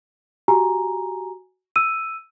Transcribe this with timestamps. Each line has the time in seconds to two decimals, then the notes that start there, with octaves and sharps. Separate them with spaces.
0.48 F#4 G4 G#5 A#5
1.76 E6 D#7